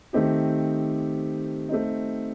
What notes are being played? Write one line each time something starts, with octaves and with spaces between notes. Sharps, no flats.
D#3 A3 C4 D#4 G4
A3 C4 D#4